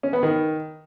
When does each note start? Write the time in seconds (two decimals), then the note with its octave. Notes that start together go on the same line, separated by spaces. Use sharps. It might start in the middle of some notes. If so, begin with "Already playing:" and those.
0.03 C#4
0.13 B3
0.23 D#3